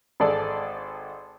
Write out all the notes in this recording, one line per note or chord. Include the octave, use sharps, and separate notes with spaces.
G#1 G#4 A4 D5 A5